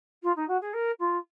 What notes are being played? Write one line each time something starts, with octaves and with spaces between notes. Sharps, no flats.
F4
D#4
F#4
G#4
A#4
F4